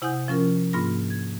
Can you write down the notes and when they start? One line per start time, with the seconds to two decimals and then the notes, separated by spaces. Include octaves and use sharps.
0.02 C3 E4 F#5 G#5 D#6 G6
0.28 F3 C#4 F4 A#4
0.73 G#2 A#3 D4 F4 B5 A#6
1.10 G#6